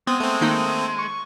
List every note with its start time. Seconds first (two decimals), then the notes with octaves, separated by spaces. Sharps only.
0.07 G#3 B3 C4 D#6
0.20 A3 C4
0.41 D#3 A#3 D#4
0.99 C#6